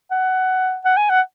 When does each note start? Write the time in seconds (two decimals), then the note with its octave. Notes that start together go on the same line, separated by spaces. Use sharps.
0.11 F#5
0.85 F#5
0.97 G#5
1.10 F#5